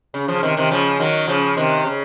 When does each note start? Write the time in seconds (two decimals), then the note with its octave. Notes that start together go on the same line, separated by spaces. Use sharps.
0.14 C#3
0.28 C#3 F3
0.43 C3 D#3
0.57 C3 D#3
0.71 C#3 F3
1.00 D#3 F#3
1.28 C#3 F3
1.57 C3 D#3
1.85 C#3